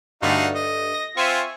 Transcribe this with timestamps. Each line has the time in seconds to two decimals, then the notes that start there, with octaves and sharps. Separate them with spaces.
0.22 G2 D3 A3 D#4 F#4 F5
0.55 D#5
0.94 A#6
1.17 C4 F4 E5 G#5 C#6